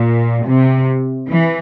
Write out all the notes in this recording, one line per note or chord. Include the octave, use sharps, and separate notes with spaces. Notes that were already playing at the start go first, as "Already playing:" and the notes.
Already playing: A#2
C3
E3